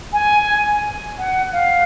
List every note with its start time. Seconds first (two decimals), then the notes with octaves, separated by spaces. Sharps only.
0.13 G#5
1.18 F#5
1.52 F5